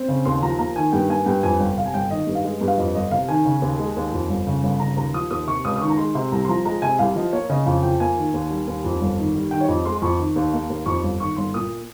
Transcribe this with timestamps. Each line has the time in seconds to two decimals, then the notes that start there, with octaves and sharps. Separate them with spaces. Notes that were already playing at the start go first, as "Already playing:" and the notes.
Already playing: C4
0.08 C#3
0.25 D#2 C6
0.42 F3 A#5
0.59 A#3 A#5
0.76 D#3 G#5
0.92 G2 G5
1.09 A#3 G#5
1.26 G2 G5
1.43 F2 G#5
1.60 G1 G5
1.77 C3 F5
1.86 G#5
1.94 G1 G5
2.10 D#3 D#5
2.27 G2
2.35 F5
2.44 G#3 D#5
2.61 G2
2.68 F5
2.78 F2 D#5
2.95 G1 D#5
3.11 C3 F5
3.28 D#3 G#5
3.45 C#3
3.62 D#2
3.79 G#3
3.97 D#2
4.13 F2
4.29 G1
4.47 C#3
4.63 G1
4.80 C#3 A#5
4.97 D#2 A#5
5.14 F3 D#6
5.31 D#2 D#6
5.47 C3 C#6
5.65 C#2 D#6
5.76 D#6
5.81 D#3 C#6
5.90 A#5
5.97 G#3 C6
6.15 C3 C6
6.32 C2 A#5
6.45 C6
6.49 F3 A#5
6.65 G#3 A#5
6.82 C3 G#5
6.99 C2 F5
7.16 F3 D#5
7.33 A#3 C#5
7.49 C#3 D#5
7.66 F2 F5
7.83 F3 G5
8.00 A#3 G#5
8.17 D#3
8.34 D#2
8.50 G3
8.67 D#2
8.84 F2
9.01 G1
9.18 D#3
9.35 G3
9.51 D#3 G5
9.61 C#5
9.68 F2 D#5
9.85 G#3 C6
9.95 C6
10.02 F2 C#6
10.19 D#3
10.36 D#2
10.53 A#3
10.70 D#2
10.86 F2 C#6
11.03 G1
11.20 D#3 C#6
11.36 G1 C6
11.54 A#2 D#6